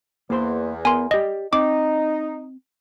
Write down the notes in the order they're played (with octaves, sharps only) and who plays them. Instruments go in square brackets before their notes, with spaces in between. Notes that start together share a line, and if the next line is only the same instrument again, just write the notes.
[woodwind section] E2 [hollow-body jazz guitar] A#3 C5 C6
[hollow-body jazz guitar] B3 A#4 [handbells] G#5 C6
[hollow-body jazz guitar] G4 D5 [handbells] D#5
[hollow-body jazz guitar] C4 [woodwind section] D#4 [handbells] D6